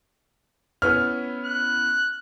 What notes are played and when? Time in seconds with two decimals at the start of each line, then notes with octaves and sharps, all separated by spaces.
0.82 B3 C#4 E4 F6
1.45 F#6